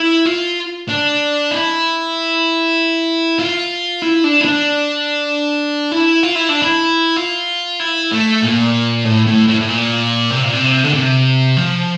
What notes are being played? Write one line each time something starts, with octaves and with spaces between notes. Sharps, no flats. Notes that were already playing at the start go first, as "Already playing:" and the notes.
Already playing: E4
F4
D4
E4
F4
E4
D4
E4
D4
E4
F4
E4
D4
E4
F4
E4
A3
A#2
A2
A2
A2
A2
A#2
C3
A#2
C3
D3
C3
F3